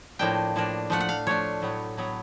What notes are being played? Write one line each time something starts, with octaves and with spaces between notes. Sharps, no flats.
A2 F3 A#3 D4 G5
A2 F3 A#3 D4
F3 A3 D4 F#5
F#5
F5
F3 A3 D4 C#5
A2 F#3 B3
A2 F#3 B3